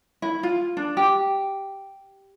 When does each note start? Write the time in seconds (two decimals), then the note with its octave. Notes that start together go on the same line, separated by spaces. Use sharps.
0.22 E4
0.43 F4
0.77 D4
0.97 G4